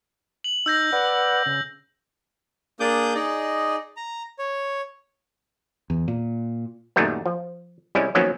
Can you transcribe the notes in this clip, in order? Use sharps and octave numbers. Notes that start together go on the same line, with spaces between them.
F#7
D#4 E6 G6 A#6
B4 D5 F#5
C#3
A#3 D4 G#4 D6 D#6 G6
D#4 G#4 D5 D#5
A#5
C#5
E2
A#2
F#2 A#2 D#3 G3 A3 B3
F3
C2 G3 G#3 C#4 E4 G#5
D#3 F3 F#3 A#3 B3 C#4